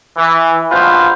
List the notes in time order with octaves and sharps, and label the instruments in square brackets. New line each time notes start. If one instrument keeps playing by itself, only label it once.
[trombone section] E3
A#1 B2 F4 B4 C5